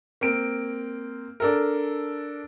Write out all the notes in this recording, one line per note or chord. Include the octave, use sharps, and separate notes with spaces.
A#3 C4 D7
D4 A4 A#4